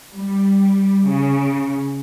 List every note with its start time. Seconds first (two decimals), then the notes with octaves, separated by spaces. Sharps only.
0.14 G3
1.09 C#3